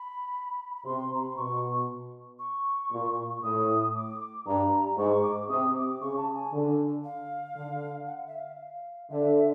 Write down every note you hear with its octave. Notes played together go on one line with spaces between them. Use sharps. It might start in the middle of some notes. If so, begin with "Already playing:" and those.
Already playing: B5
B5
C3 C6
A#5
B5
C6
B2 C#6
C#6
A#2
A2 D#6
D6
G2 A#5
G#2 C#6
D6
C3 D#6
D6
C#3 C#6
A5
G#5
D3
F5
D3
F#5
F5
E5
F5
D3 E5